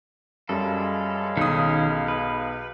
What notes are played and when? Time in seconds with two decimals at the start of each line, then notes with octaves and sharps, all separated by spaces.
0.49 F#2 G3 G#3 A4 F5 B5
1.37 B1 D#3 C#4 D#6
2.08 B4